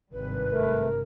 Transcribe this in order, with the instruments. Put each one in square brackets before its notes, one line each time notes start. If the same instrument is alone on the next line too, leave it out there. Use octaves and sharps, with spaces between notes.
[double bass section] G#1 G2 C3 [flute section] B4
[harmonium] A3 [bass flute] A#4